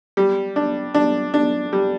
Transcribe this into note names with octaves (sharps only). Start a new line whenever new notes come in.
G3
D4
D4
D4
G3